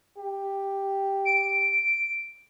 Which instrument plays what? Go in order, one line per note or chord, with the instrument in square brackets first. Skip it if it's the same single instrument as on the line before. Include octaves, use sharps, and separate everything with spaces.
[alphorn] G4
[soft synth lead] D7